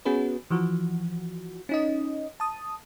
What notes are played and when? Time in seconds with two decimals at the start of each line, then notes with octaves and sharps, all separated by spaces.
0.05 B3 C#4 F#4 G#4 B4
0.50 E3 F3 F#4
1.69 C#4 D#4 D#5
2.40 A5 D#6